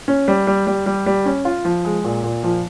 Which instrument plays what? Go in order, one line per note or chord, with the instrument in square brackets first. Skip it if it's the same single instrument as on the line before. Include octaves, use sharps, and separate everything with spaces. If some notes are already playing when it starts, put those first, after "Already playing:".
[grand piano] C#4
G3
G3
G3
G3
G3
C#4
F4
F3
G#3
A#2
A#2
F3